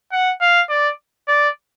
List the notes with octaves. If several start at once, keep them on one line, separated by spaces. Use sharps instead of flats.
F#5
F5
D5
D5